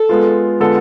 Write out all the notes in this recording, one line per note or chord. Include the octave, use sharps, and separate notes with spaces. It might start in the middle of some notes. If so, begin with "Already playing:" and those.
Already playing: A4
G#3 B3 F4
D3 G#3 B3 F4 A4